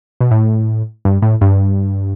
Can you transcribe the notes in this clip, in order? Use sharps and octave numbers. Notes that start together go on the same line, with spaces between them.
B2
A2
G2
A2
G2